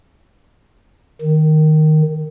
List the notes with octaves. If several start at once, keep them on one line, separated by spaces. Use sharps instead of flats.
D#3